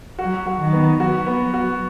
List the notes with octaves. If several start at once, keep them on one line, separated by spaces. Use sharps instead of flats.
F#3 F#4
F#4
D#3
B3
F#3 F#4
B3
F#4